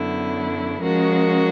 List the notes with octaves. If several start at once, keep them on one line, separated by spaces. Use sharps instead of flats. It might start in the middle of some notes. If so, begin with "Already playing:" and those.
Already playing: F#2 D3 F#3 B3 E4
F3 G#3 C#4 F#4 A#4